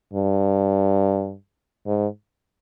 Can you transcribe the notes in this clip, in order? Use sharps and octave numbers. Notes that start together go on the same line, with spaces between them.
G2
G#2